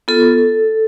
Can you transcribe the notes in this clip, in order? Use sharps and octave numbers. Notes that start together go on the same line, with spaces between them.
B3 F4 A4